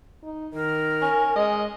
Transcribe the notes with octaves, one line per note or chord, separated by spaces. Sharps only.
D#4
D#3 A#4
C#4
G#3 D#5